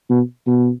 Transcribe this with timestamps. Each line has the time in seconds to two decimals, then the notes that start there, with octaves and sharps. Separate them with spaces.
0.10 B2
0.47 B2